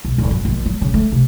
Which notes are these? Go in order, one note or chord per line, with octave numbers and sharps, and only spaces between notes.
B1
D1
F#2
A#1
F#3
C#3
A3
C3